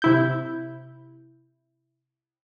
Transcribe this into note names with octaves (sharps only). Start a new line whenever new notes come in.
C3 E4 G6